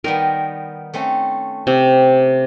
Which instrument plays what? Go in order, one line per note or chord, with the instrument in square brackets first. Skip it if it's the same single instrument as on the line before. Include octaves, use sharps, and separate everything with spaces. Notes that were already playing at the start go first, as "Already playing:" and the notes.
[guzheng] D#3 G3 B3 [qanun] A#4
[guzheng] A3 C4 C#4
[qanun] C3 [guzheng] G4